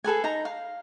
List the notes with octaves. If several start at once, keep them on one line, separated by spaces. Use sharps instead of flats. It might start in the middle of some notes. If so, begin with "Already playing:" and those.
G#4 A4 B4 G#5
D#4 A#5
F5